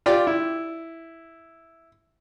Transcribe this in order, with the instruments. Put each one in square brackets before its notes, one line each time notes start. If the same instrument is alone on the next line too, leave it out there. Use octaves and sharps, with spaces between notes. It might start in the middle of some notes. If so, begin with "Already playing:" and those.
[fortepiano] F4 G4 D5
E4